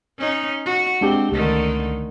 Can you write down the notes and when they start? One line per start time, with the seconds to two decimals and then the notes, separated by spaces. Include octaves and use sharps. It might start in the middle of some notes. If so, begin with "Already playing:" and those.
0.18 C#4 D#4
0.65 F#4
1.01 G#3 C4 D4 G4
1.32 C#2 D3 D#3 A3